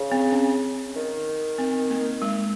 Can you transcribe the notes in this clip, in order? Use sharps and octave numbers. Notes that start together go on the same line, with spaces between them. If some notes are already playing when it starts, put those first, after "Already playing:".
Already playing: C#3
C4
C#4
D#3
C4
A#3
G#3